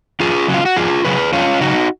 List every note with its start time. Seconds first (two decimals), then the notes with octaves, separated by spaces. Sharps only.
0.20 F2 F4 G#4
0.48 C#3 F#3
0.54 F4
0.65 F#4
0.76 F2 F4 G#4
1.05 C#3 F#3 G#4 B4
1.33 F2 C#4 F4
1.61 C#3 F#3 D#4 F#4